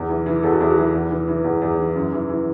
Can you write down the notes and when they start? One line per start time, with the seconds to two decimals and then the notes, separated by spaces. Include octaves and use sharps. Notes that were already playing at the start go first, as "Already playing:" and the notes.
Already playing: E2
0.09 E3
0.26 E3
0.43 E2 A4
0.52 F#4
0.60 E2 E4
0.70 F#4
0.77 E3
0.93 E2
1.10 E3
1.28 E3
1.44 E2
1.62 E2
1.79 E3
1.95 F#2
2.12 E3
2.29 E3